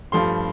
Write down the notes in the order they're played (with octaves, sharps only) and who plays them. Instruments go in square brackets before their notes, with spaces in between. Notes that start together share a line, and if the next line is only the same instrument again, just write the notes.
[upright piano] G2 F3 A3 C6